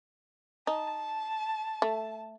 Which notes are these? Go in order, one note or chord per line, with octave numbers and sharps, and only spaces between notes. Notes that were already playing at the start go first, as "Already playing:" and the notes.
D#4 A5
A3